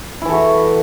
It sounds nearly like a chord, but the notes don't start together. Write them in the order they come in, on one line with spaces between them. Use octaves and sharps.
E4 E3 A4 F#4